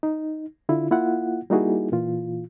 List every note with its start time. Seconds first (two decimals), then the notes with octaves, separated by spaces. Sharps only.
0.03 D#4
0.69 D3 E4 F4
0.91 A#3 E4 F4 F#5
1.50 G3 A#3 D#4 E4 F#4 G#4
1.92 A#2 E3 F4